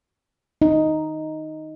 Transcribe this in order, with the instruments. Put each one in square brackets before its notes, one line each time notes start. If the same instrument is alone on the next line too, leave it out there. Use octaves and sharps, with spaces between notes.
[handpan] D#4